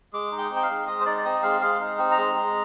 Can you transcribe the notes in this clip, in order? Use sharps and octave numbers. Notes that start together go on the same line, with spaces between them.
G#3 D6
D#4
G5
C4
G5
F5
G#3
G#3 D#5
C5
D#4 D5
D5
C4 D#5
G#3 F5
G#3 F5
D#4
C4
A#5
G#3
G#3